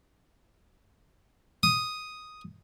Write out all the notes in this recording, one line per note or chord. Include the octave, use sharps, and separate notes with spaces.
D#6